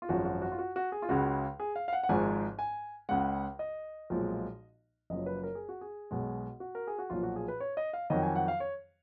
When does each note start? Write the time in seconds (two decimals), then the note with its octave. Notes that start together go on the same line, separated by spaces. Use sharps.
0.02 F4
0.09 G#1 F#2 F3 G#3 F#4
0.25 F#4
0.42 F#4
0.52 F4
0.59 F#4
0.76 F#4
0.92 G#4
1.02 F4
1.09 C#2 C#3 G#3 F#4
1.60 G#4
1.76 F5
1.88 F5
1.93 F#5
2.03 F#5
2.09 G#1 G#2 F3 G#3 G#5
2.59 G#5
3.09 C#2 C#3 G#3 F#5
3.59 D#5
4.10 B1 A#2 F3 G#3
5.10 F#1 F#2 F3 D#5
5.26 B4
5.43 A#4
5.55 G#4
5.69 F#4
5.81 G#4
6.11 B1 B2 G#3
6.60 F#4
6.75 A#4
6.87 G#4
6.98 F#4
7.10 B1 A#2 F3 F4
7.23 F#4
7.36 G#4
7.48 B4
7.60 C#5
7.77 D#5
7.93 F5
8.10 F2 D#3 F#3 D#5
8.23 G#5
8.36 F#5
8.48 F5
8.60 C#5